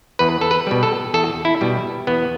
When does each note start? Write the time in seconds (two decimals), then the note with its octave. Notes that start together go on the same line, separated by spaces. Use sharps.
0.19 E2 B4
0.41 A4
0.51 B4
0.67 B2 G3
0.83 A4
1.14 E2 A4
1.45 E4
1.61 B2 G3
2.07 E2 B3